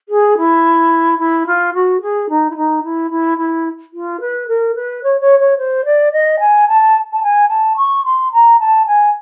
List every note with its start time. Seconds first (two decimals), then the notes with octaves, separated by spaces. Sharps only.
0.09 G#4
0.37 E4
1.19 E4
1.46 F4
1.74 F#4
2.01 G#4
2.29 D#4
2.50 E4
2.56 D#4
2.83 E4
3.11 E4
3.38 E4
3.93 F4
4.20 B4
4.48 A#4
4.75 B4
5.03 C#5
5.20 C#5
5.39 C#5
5.58 C5
5.85 D5
6.12 D#5
6.39 G#5
6.68 A5
7.12 A5
7.23 G#5
7.49 A5
7.77 C#6
8.05 C6
8.32 A#5
8.60 A5
8.86 G#5